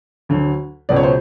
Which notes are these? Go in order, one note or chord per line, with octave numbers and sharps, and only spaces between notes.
D2 D3 F#3
C#2 B2 F#3 D5
C#5
C5